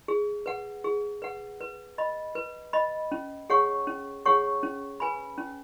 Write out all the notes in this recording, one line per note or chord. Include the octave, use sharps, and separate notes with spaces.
G#4
B4 F#5
G#4
B4 F#5
B4
D#5 B5
B4
D#5 B5
C#4
G#4 C#5 F#5 C#6
C#4
G#4 C#5 F#5 C#6
C#4
B4 G#5 B5
C#4